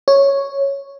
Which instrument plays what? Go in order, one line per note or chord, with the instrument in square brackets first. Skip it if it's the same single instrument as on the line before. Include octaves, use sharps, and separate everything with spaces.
[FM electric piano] C#5